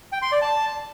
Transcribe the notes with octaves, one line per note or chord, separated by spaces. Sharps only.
G5
C6
D5
A5